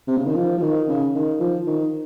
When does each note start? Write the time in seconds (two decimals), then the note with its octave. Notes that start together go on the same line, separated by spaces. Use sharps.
0.08 C3
0.17 C#3
0.27 D#3
0.36 F3
0.58 F3
0.62 D#3
0.88 C#3
1.15 D#3
1.40 F3
1.67 D#3